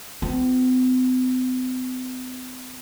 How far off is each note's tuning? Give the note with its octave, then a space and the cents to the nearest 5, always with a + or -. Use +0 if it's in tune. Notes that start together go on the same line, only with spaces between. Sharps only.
C4 -45 F4 +25